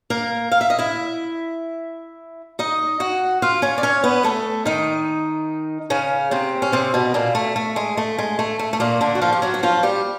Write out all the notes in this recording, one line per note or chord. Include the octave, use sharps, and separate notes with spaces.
A#3 A#4
F5
E5
D#5
E4 E5
D#4 D#5
F#4 F#5
F4 F5
C#4 C#5
D5
C#4 C#5
B3 B4
A3 A4
D#3 D#4
C#3 C#4
C3 C4
C#4
C3 C4
B2 B3
A#2 A#3
A3
A3
G#3
A3
G#3
A3
A3
A3
A#2 A#3
D3 D4
F#4
F3 F4
G4
F#3 F#4
F#4
F3 F4
G3 G4